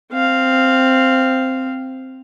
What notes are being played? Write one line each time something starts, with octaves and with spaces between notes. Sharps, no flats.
C4 F5